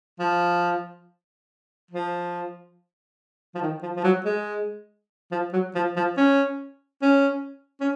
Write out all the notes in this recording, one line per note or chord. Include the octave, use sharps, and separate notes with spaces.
F3
F3
F3
D#3
F3
F3
F#3
G#3
F3
F#3
F3
F3
C#4
C#4
C#4